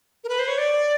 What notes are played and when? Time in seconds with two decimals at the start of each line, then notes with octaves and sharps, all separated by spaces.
0.24 A#4
0.29 B4
0.39 C5
0.48 C#5
0.58 D5